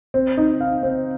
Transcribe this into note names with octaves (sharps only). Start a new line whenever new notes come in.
C4
D#4
F5
C4